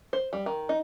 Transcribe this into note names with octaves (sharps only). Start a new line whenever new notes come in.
C5
G3
D#3
D#4